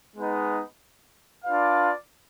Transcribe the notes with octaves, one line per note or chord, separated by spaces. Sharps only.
G#3 B3 D#4
D4 F4 B4 D5 F5